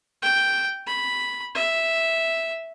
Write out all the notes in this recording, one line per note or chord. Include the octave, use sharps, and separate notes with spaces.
G5
B5
E5